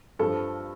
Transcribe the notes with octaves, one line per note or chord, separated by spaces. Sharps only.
G2 F3 A4